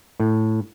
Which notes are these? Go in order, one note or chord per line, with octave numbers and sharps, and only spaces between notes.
A2